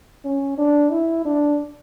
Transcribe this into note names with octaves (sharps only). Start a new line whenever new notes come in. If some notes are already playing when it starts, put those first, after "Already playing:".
C#4
D4
E4
D4